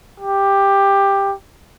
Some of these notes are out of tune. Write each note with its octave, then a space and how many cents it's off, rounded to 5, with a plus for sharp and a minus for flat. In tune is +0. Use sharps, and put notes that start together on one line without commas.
G4 +10